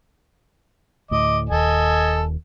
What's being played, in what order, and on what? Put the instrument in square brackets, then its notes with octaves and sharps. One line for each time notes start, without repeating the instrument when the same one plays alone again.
[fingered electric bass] D2 A2 [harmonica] D#5 D6
[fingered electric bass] D#1 D#2 [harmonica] A4 D#5 G#5